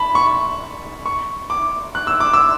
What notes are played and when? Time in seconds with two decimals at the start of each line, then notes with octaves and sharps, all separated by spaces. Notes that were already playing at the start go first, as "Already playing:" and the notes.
Already playing: A5 B5
0.15 C#6
1.06 C#6
1.50 D6
1.95 F#6
2.07 E6
2.20 D6
2.33 E6